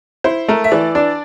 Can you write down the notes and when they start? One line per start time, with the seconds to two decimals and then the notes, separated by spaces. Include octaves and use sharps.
0.24 E4 C5
0.48 A3 A#4
0.64 E5
0.72 E3 D5
0.95 D4 D5